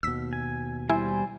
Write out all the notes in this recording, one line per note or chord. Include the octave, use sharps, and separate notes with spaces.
D#2 B2 E6 B6
G#5
G3 E4 C5 G#5